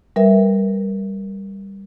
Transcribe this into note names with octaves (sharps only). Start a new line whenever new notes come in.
G3 A#4 B4 E5